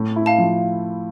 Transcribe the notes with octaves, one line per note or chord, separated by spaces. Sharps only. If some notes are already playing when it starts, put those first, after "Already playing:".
Already playing: A2
E4
F5 A5
F3